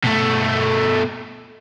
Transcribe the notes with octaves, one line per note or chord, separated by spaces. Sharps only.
B2 A3